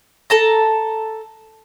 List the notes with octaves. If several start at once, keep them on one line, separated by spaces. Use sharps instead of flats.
A4 A5 A#5